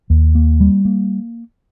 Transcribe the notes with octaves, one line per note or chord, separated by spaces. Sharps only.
D#2
A#3
G3
A#3